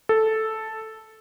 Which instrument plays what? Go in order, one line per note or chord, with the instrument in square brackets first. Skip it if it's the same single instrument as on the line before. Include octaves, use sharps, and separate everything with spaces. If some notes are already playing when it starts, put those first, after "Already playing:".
[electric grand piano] A4